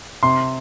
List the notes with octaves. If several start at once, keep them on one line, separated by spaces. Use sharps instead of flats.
C3 C6